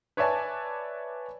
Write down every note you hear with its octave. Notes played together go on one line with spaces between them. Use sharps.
B4 C#5 D5 E5 G#5 A5